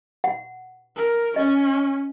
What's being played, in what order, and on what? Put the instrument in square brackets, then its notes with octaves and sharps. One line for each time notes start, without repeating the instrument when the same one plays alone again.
[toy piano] F#5
[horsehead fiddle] A#4
[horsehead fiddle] C#4 [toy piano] D#5